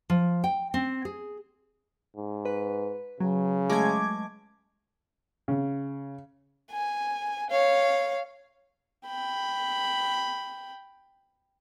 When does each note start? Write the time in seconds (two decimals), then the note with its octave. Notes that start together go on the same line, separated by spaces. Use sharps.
0.10 F3
0.44 G5
0.74 C4
1.05 G#4
2.16 G#2
2.45 B4
3.20 C#3 F#3
3.70 G#3 A3 D6 G#6
5.48 C#3
6.72 G#5
7.50 C#5 F5
9.07 G5 B5